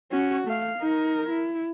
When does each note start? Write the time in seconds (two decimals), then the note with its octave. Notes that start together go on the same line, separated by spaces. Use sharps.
0.12 C#4 F#4
0.48 A3 F5
0.79 D#4 A#4
1.29 E4